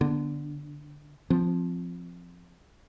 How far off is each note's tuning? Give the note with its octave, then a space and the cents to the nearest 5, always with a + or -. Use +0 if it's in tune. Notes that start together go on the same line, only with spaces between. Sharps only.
D3 +0 B3 -15
F3 +0 C4 +0